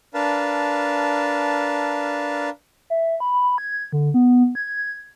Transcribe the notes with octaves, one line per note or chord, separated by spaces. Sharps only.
D4 A#4 B4 F5 A5
E5
B5
G#6
D3
B3
G#6